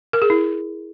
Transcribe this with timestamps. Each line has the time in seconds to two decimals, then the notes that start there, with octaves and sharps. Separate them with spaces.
0.13 A#4
0.22 G#4
0.30 E4